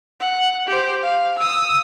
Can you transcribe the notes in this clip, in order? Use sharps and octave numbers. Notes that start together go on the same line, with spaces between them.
F#5
G4 C5
F5
D#6 E6